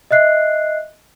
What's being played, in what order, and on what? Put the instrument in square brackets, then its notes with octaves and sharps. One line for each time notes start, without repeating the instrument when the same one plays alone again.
[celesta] D#5 E5 F#6 C7